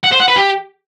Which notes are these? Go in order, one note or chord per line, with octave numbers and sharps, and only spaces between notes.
F#5
C5
F#5
B4
G4